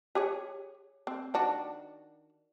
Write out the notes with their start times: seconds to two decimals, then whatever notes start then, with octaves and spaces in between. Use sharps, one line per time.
0.15 G4 G#4 C#5
1.07 C4
1.34 D#3 D4 F#4